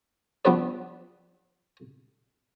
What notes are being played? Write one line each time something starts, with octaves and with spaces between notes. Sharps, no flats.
F3 G3 B3 D4 B4 D5